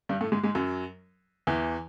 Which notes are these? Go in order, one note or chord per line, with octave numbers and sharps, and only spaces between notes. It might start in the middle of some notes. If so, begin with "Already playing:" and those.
G2 G3
A2 A3
G#2 G#3
G#2 G#3
F#2 F#3
E2 E3